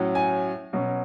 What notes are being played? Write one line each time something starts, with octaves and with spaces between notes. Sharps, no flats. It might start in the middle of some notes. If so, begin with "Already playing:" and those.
Already playing: A2 F#3 C#4
G#5
B2 F#3 C#4